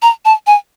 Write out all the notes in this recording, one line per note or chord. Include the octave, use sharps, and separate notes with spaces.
A#5
A5
G#5